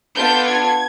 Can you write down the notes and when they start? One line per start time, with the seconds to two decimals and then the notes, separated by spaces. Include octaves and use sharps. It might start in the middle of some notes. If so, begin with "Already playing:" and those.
0.16 B3 D4 F4 A4 G6
0.46 G#6